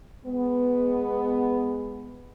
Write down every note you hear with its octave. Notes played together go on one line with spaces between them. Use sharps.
G#3 B3